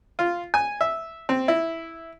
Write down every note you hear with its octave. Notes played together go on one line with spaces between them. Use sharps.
F4
G#5
E5
C4
E4